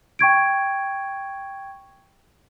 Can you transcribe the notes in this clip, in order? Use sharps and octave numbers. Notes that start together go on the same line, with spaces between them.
G5 C#6 G#6 D7